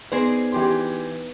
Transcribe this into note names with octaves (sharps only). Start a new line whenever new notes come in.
B3 D#4 G#4 B4 C5 D5
E3 G4 C6